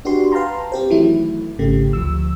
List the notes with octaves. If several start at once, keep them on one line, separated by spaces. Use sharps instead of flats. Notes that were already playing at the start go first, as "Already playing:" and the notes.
D4 F#4 G4 B4 C6
B4 F5 G5 A5 A#5 C6
C4 G4 C5
D#3 E3 F#3 A3 E4
G#1 C#3 A3 G4
D2 F3 E6